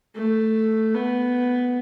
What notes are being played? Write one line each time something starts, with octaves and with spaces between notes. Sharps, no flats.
A3
B3